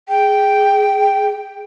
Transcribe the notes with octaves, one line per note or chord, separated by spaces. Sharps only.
G#4 G5